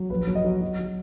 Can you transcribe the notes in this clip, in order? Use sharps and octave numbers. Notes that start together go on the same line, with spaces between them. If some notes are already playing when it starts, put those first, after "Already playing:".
Already playing: F#3
A#1 B4
F#3
D#5
F#3
F#3
F#3